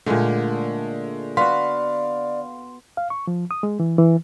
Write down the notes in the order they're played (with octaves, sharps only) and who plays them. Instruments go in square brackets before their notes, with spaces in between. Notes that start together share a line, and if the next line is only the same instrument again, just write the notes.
[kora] A#2 D3 [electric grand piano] G#3 A3
[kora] B3 F#4 [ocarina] D5 [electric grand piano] F5 B6 [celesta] C6
[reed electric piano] F5
C#6
F3
D#6
G#3
E3
E3